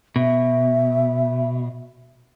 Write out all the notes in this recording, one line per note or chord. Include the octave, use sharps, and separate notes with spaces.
B2 E5